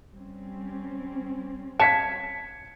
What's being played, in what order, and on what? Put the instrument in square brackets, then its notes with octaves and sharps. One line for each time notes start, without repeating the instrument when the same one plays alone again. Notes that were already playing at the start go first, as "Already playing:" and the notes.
[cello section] G3 C4 C#4
[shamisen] C#5 F5 A5 [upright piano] G#6 B6 C#7